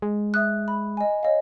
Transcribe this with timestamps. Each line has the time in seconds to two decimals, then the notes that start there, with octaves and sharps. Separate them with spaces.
0.02 G#3
0.34 E5 D#6 F#6
0.68 B5
0.97 D#5 G#5
1.23 C#5 D#5 F5